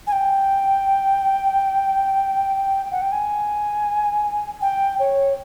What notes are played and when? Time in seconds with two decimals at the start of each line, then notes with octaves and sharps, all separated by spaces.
0.07 G#5
0.12 G5
2.92 F#5
3.01 G5
3.12 G#5
4.62 G5
4.99 C#5